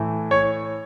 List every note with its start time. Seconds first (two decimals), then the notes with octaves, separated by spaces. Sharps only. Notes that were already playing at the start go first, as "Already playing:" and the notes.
Already playing: A2 E3 A3
0.31 C#5